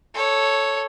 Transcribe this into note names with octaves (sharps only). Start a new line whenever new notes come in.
A4 C#5